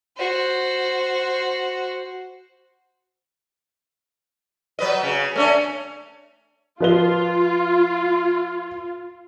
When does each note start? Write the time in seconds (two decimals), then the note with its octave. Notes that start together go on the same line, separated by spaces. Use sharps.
0.17 F#4 C5
4.79 F#3 B4 D#5
5.03 C#3
5.36 A3 C#4 D4
6.80 F3 F4 B4 G7